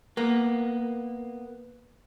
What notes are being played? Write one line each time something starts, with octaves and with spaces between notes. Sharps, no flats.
A#3 B3